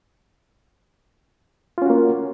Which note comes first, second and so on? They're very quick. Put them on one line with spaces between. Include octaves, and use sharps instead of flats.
F4 C#4 F#4 A#3